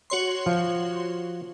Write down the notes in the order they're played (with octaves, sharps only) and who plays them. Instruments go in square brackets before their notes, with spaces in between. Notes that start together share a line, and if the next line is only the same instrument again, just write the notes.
[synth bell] F#4 C#5 C6
[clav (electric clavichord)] F3